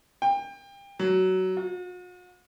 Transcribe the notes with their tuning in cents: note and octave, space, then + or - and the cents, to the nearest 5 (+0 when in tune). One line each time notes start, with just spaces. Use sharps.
G5 +30
F#3 +15
F#4 -45